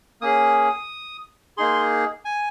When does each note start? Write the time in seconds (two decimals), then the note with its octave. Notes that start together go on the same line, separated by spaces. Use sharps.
0.21 A#3 C#4 G#4 D#6
1.57 A#3 D#4 G#4 C6
2.25 G#5